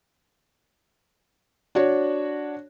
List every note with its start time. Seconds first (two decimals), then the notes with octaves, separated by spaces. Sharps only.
1.75 D4 F#4 C#5